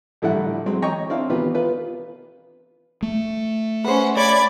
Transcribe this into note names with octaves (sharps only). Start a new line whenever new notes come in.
A#1 A2 D3 G3 E4 F#5
F#3 G#3 C4
C#5 D#5 G5 A#5 C#6
C4 D4 E4 F5
B2 D#3 E3 F4 G4 B4
B3 F4 B4
A3
C#4 B4 C5 F#5
C#5 D5 B5 D6 G#6